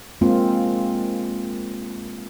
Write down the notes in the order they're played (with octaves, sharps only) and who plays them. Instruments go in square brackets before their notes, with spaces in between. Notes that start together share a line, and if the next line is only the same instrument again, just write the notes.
[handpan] G#3 A#3 C4 F4